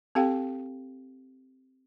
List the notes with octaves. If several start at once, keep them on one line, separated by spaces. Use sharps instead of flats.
C4 G4 A4 F5 G5